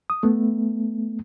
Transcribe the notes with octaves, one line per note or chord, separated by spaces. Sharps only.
D#6
A3 B3